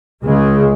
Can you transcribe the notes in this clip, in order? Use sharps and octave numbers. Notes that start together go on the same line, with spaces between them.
C#2 C#3 G#3